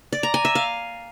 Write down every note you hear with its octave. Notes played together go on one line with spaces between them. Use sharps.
D5
A#5
G#5
E5
F5